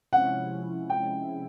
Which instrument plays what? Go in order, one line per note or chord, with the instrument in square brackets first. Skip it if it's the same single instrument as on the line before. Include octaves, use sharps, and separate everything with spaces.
[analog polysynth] C3 F3 G#3 C#4 E4 [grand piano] F#5
[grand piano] G5